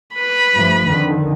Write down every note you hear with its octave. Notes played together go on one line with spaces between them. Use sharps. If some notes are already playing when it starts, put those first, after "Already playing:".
B4 B5
G2 F3 A3
F2 D3 D#3